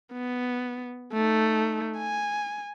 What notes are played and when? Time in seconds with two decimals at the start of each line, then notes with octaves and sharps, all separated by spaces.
0.13 B3
1.13 A3 D#4
1.98 G#5